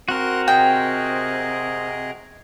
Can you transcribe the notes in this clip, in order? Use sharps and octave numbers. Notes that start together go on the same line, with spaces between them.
C4 F#4 A#4 C6 F#6
C3 G#4 D#5 G5